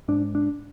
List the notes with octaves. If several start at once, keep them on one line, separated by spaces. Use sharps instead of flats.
G#2 D4
D4